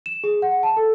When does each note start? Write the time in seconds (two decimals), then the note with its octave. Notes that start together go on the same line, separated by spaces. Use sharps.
0.06 E7
0.24 G#4
0.42 F#5
0.63 A5
0.77 A4